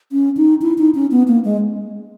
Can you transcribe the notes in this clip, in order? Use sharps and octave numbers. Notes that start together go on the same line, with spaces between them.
C#4
D#4
E4
D#4
C#4
B3
A#3
G#3